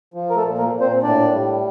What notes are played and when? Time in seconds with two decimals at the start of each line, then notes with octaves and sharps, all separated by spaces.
0.14 F3
0.30 A#4
0.36 A3 A4
0.43 A#2
0.58 A#3 A#4
0.73 A#2
0.81 C4 C5
1.03 A2 D4 D5
1.32 G3